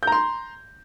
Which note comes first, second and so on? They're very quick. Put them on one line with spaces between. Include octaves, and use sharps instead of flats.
G6 A#5 C6